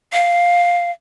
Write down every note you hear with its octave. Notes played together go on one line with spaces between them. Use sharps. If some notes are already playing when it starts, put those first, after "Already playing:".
F5